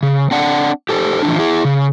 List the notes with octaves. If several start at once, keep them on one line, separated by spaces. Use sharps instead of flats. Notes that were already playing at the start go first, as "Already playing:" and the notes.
C#3
C4 D4 F#5
G4 A4 C5
E3 F3 D4
E4 G#4
C#3